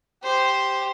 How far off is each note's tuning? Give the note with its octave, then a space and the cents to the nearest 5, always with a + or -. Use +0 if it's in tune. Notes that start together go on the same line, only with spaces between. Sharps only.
G4 +0 C5 +0